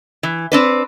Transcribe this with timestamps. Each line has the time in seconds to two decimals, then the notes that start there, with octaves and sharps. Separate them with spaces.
0.23 E3
0.52 C4 D4 B4